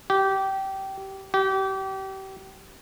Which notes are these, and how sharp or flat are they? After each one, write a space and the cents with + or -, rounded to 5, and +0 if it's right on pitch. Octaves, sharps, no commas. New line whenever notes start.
G4 -20
G4 -30